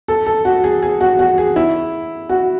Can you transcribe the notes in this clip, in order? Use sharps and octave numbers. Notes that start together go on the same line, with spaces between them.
A4
A4
F#4
G#4
G#4
F#4
F#4
G#4
E4
F#4